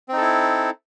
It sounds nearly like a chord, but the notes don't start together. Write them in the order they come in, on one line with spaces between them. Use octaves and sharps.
C4 D#4 A4 E4